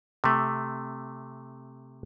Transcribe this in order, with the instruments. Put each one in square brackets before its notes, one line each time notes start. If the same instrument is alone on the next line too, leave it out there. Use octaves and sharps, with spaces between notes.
[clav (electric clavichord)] C3 A3